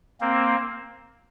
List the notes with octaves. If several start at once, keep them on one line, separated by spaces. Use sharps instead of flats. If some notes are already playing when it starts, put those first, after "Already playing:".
A#3 C4